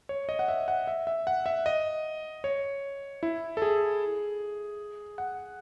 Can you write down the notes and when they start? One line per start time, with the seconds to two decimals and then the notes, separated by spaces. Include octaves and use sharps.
0.09 C#5
0.29 D#5
0.39 F#5
0.48 E5
0.68 F#5
0.87 E5
1.07 E5
1.27 F#5
1.46 E5
1.66 D#5
2.44 C#5
3.23 E4
3.57 A4
3.62 G#4
5.18 F#5